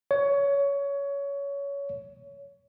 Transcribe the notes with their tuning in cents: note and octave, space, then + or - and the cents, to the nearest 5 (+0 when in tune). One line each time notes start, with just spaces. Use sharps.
C#5 +20